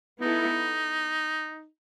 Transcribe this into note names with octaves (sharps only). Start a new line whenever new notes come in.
B3 D#4 E4 A4